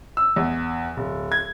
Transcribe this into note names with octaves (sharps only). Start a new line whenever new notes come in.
E6
E2
D1
G#6